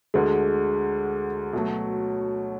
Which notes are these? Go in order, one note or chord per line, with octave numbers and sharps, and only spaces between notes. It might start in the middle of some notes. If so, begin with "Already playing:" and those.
D2 D3 G#3
B2 F#3 A3